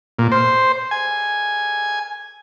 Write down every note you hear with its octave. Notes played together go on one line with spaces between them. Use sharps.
A#2
C5
G#5